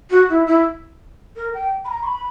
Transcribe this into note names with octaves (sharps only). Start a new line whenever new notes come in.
F#4
E4
E4
A#4
G5
B5
A#5
C#6
B5